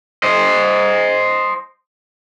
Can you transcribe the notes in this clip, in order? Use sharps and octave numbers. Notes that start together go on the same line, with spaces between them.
C5 D#5